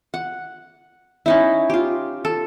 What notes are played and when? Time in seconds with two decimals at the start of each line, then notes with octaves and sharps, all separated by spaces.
0.14 F#5
1.26 C#4 D#4 E4
1.70 F4 G4
2.25 A4